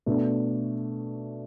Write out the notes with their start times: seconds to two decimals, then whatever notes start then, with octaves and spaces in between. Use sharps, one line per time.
0.06 B2 A3 D4